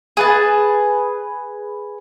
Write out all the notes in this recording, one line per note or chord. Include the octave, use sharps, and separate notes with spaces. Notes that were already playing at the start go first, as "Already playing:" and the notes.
G#4 B4 A5